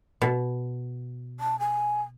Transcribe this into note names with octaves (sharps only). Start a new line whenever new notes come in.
B2
A5
G#5